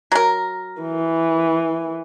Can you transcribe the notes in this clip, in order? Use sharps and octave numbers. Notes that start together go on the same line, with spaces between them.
F#3 A#4
E3